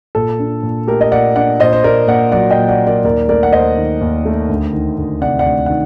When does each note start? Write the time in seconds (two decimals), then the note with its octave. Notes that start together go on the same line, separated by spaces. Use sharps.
0.15 A#2 A4
0.39 D4
0.63 A#2
0.87 A3 G4 A#4
1.01 D#5
1.12 A#2 D5 F#5
1.35 D4 D5 F#5
1.60 A#2 C5 D#5
1.73 C5
1.84 A#3 A#4 D5
2.08 A#2 D5 F#5
2.32 F#3 D5 F#5
2.50 D#5 G5
2.57 A#2
2.69 D5 F#5
2.81 A#3
2.87 A#4 D5
3.04 D#2 A#4 D5
3.28 A3 A#4 D5
3.43 F#5
3.53 D#2 C5 D#5
3.77 D#3
4.01 D#2
4.25 A3
4.49 D2
4.73 D#3
4.98 D2
5.21 C3 D5 F#5
5.39 D5 F#5
5.46 D2
5.66 D#3 F#5